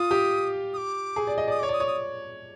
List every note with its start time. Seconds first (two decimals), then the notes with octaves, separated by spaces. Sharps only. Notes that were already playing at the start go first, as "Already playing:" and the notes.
Already playing: F4 D#6
0.11 G4
0.73 D#6
0.77 D6
1.16 G#4
1.27 D5
1.38 D#5
1.48 D5 D#6
1.59 C#5 D6
1.69 D5 D#6
1.80 C#5
1.87 D#6